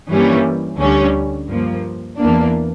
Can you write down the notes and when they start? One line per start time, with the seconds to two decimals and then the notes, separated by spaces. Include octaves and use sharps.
0.10 G2 E3 G3 A#3 C#4
0.80 D2 D3 G3 C#4
1.49 G2 F3 A#3
2.19 E2 E3 A#3 D4